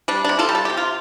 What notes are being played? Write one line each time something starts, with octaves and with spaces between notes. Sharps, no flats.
G3 D4
C3 D4
F4 A4
G3
A4
C3 G4
F4